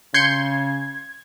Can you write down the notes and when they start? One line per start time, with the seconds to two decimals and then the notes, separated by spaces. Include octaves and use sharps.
0.14 C#3 C6 G6 G#6 C#7